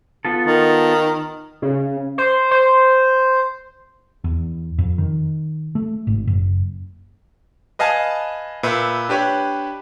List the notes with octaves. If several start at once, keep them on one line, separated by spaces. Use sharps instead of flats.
B3 F4 A4
D#3
C#3
C5
C5
E2
F2
D#3
A3
G#1
F#1
B4 D#5 F5 G#5 A5
A#2 B4 E5
D4 G4 B4 C#5